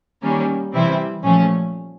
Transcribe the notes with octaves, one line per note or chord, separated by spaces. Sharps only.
D#3 G3 A#3 C#4
C3 E3 G3 C4 E4
A#2 F3 A3 C#4